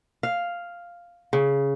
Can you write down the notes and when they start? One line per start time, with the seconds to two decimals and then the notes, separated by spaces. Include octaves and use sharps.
0.23 F5
1.33 C#3